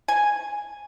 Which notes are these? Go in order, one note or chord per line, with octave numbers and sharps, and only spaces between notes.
G#5